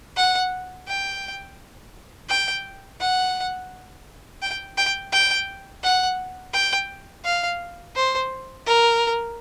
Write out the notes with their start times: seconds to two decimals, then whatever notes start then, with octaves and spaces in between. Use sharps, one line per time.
0.17 F#5
0.88 G5
2.29 G5
3.00 F#5
4.42 G5
4.78 G5
5.12 G5
5.84 F#5
6.53 G5
7.25 F5
7.95 C5
8.67 A#4